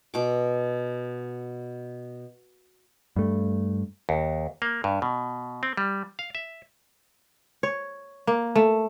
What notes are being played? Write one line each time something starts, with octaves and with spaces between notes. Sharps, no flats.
B2 D6
G2 A3
D#2
A#3
G2
B2
C4
G3
F5
E5
C#5
A#3
A3